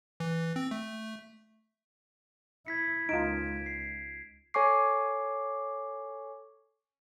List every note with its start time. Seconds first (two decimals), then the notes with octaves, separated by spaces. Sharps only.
0.20 E3
0.56 C4
0.71 A3
2.67 E4 G#6 B6 C#7
3.09 C#2 D#4 F4 D7 E7
3.66 C7
4.54 A4 C#5 G#5 C#6 D6 C7